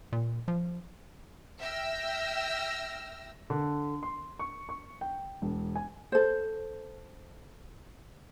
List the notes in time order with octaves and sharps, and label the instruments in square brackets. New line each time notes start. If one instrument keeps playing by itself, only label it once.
[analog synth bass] A#2
F3
[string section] E5 G5 E6 F6 A#6
[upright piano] D3
C6
C#6
C#6
G5
E1
G#5
[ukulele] A4 C5